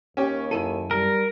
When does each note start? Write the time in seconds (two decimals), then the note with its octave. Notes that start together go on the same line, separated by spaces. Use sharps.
0.17 D#2 C#4 G4
0.51 F#2 E4 A4 D#7
0.91 G3 A#4